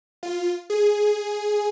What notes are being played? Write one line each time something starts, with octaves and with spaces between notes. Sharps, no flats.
F4
G#4